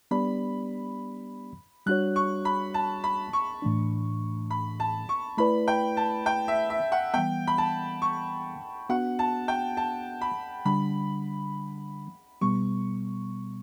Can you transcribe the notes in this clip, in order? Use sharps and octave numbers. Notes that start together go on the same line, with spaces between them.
G3 B3 D4 G4 D5 B5
G3 D4 F#4 C#5 F#6
C#6
B5
A5
B5
C#6
A2 E3 A3 D4
B5
A5
C#6
A3 E4 B4 D5 B5
G5
A5
G5
E5
E5
F#5
E3 G3 B3 G5
B5
A5
C#6
B3 D4 F#4 F#5
A5
G5
A5
B5
D3 G3 D4 B5
B2 G3 B3 C#6